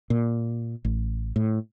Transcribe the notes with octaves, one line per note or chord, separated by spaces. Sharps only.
A#2
A1
A2